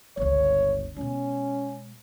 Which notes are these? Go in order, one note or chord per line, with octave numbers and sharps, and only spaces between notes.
G1 C#2 C#5
B2 G#3 C#4